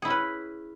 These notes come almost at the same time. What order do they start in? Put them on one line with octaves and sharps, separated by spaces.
G#4 E4 C#4 B4